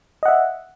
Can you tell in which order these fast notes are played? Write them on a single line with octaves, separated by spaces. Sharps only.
D#5 F#5 E5